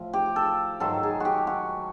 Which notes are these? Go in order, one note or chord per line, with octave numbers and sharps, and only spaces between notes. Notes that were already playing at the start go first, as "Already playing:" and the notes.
Already playing: A2 F3
G4
A4
G#2 D#3 F#3 A4
G#4
F#4 G4
F#4